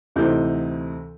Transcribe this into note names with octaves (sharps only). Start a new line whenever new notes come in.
D2 C3 E3 D#4 G6